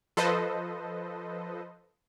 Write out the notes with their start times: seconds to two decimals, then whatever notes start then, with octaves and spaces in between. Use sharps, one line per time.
0.17 F3 A4 B4 C5 D#5